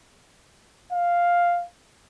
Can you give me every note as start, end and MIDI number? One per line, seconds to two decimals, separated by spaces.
0.92 1.65 77